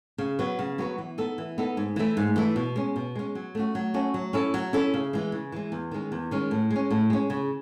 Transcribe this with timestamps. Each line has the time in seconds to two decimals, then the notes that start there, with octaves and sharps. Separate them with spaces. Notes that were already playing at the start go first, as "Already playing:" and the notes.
0.18 C#3
0.39 F#3 B3 F#4 B4
0.59 C#3
0.78 F#3 B3 F#4 B4
0.98 E3
1.18 B3 D#4 A4
1.38 E3
1.58 B3 D#4 A4
1.77 G#2
1.96 E3 A3 E4
2.17 G#2
2.36 E3 A3 E4
2.56 B2
2.76 G#3 C#4
2.96 B2
3.15 G#3 C#4
3.35 F#3
3.55 A3 C#4 F#4
3.75 F#3
3.94 A3 C#4 F#4
4.14 F#3
4.33 C#4 E4 A4
4.54 F#3
4.73 C#4 E4 A4
4.94 C#3
5.13 E3 G#3
5.32 C#3
5.52 E3 G#3
5.72 E2
5.91 D#3 G#3 C#4
6.12 E2
6.31 D#3 G#3 C#4
6.51 A2
6.70 G#3
6.76 C#4
6.90 A2
7.10 G#3 C#4
7.30 C#3